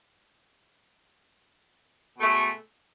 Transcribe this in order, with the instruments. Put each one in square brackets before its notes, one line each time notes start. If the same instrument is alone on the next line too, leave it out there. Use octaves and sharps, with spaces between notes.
[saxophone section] B2
A3
G#3